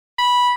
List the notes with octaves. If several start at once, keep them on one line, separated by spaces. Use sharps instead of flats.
B5